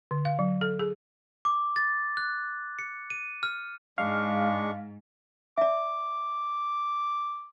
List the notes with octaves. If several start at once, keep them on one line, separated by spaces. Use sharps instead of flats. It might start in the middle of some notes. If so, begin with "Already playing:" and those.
D3
F5
F#3
A4
G#4
D6
A6
F#6
C#7
D#7
F6
G#2 G#3 D4 F5 C#6
D5 E5 D6